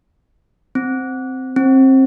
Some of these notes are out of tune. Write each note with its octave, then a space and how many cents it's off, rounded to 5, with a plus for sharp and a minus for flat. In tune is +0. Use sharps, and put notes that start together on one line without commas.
C4 -5
C4 +25